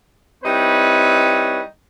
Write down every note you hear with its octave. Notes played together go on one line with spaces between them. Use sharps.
G3 C4 D#4 E4 B4 C#5